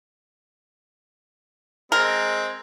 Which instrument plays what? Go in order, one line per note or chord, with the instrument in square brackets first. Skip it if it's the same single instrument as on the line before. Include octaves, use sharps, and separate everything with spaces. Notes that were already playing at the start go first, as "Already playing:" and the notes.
[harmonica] G#3 C4 [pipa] A#4